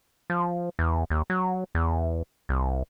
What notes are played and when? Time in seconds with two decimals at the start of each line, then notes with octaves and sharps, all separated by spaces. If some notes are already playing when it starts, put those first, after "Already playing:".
0.30 F3
0.79 E2
1.10 D#2
1.30 F#3
1.75 E2
2.49 C2